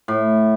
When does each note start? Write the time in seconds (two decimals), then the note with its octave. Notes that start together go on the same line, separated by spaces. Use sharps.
0.08 A2